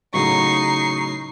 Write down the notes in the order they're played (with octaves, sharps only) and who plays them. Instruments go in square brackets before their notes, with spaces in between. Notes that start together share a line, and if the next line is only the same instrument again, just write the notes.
[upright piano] A2 C#3 F#3 [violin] D#4 C7 [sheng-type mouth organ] C#6